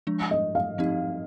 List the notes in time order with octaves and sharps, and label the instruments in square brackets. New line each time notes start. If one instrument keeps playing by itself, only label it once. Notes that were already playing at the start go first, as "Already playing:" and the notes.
[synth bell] F3 G#3 D4
[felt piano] D#5
F5
[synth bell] F3 C4 D#4 G4